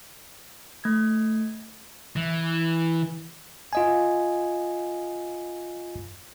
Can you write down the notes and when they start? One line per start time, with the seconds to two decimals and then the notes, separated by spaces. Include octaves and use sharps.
0.84 A3 G#6
2.16 E3
3.73 F4 D#5 G#5